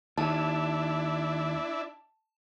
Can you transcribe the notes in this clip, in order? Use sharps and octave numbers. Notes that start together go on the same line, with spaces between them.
D#2 D4 E4 A5